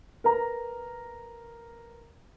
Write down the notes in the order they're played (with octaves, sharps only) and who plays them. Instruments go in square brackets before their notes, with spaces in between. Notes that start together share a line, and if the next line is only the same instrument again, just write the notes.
[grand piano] A#4 B4 A#5